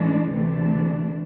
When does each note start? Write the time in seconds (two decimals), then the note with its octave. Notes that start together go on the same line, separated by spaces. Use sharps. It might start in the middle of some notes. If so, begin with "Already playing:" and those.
Already playing: A2 E3 G#3 D4
0.29 D2 C3 E3 A3 D4